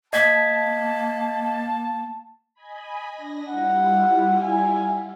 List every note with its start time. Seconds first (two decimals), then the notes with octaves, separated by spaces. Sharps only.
0.13 A#3 D#5 A5 G#6 B6
2.54 D#5 G#5 B5
3.10 D4 A#6
3.50 G3 E4 F4 F#5
4.42 G#5